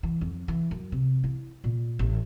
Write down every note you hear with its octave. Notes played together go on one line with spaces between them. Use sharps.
E3
F2
E3
F#2
C3
E4
A#2
A1